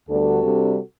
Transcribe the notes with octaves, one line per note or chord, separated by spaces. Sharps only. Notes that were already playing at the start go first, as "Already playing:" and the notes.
D2 D3 G3 B3 D4 F#4 A4
C3 G3 D4